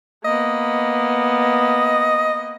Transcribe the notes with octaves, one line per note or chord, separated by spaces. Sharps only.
A#3 B3 D#5